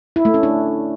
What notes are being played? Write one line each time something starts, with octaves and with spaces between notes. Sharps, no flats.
E4
A3
C#4
D4